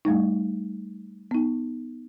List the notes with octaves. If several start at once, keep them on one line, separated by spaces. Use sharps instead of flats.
G3 A3 D#4
B3 D#4